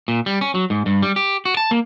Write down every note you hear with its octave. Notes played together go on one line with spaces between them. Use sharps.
A#2
G3
C#4
F#3
G#2
G2
G3
G4
F#4
A5
A#3